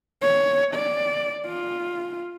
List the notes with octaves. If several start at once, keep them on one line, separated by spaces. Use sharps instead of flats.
C#5
D5
F4